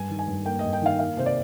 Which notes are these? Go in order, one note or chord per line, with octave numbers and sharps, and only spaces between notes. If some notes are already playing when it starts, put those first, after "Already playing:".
Already playing: G2 G#5
D#3
G#5
G2
A#3 G5
G2 D#5
G5
D#3 F5
A#3 F5
C3 C5
D5